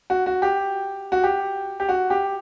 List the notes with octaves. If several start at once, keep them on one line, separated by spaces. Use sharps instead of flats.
F#4
F#4
G4
F#4
G4
G4
F#4
G4